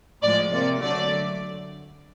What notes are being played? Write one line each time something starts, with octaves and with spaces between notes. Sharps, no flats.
A2 F3 G#3 D5
C3 F3 A#3 D5
D3 F#3 A3 D5